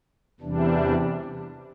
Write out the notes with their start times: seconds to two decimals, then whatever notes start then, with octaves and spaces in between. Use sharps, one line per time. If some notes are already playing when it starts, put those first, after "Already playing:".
0.40 E2 C3 E3 G3 D4